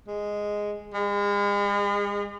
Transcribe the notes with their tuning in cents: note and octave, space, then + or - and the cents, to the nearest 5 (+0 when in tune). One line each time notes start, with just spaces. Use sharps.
G#3 -5
G#3 -40